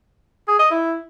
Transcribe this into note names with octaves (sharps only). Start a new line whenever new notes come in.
G#4
D#5
E4